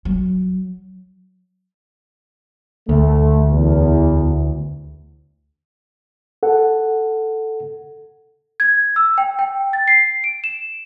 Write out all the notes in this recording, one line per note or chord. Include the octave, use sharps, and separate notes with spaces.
F#3
D2 A3
E2
A4 F#5
G#6
E6
G5
G5
A6
C7
D7
E7